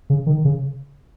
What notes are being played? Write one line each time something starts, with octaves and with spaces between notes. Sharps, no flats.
C#3
D#3
C#3